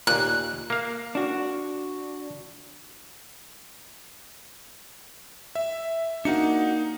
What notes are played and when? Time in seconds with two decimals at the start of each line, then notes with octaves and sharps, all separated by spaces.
0.07 D#2 A#2 F#6
0.70 A#3 F5
1.15 D4 F#4
5.55 E5
6.25 A#3 D4 D#4 F#4 F#5 C#7